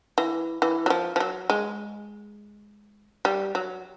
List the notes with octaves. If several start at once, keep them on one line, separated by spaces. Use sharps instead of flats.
E3
E3
F#3
F3
F3
F#3
G#3
G3
F#3